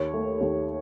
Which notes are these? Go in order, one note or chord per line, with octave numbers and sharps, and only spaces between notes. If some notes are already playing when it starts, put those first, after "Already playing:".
Already playing: D#2 C#5
A3
D#2